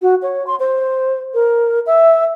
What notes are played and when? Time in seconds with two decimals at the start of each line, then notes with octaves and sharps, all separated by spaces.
0.02 F#4
0.22 C#5
0.47 C6
0.60 C5
1.34 A#4
1.86 E5